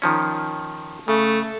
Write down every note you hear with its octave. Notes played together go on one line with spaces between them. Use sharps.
D#3 F3 C#4
C#3 A3